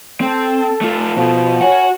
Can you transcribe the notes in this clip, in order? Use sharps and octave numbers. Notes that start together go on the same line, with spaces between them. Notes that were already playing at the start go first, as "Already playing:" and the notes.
C4 A4
A3 F4
B2 F3
F#4 A#4 C#5 F#5 G#5